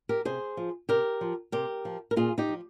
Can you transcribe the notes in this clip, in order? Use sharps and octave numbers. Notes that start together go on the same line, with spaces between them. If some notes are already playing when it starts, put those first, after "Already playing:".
G4 A#4
C3 G#4 C5
F3
C3 G4 A#4
F3
C3 G4 A#4
F3
A#4
A#2 F4 G#4
D#4 G4
F3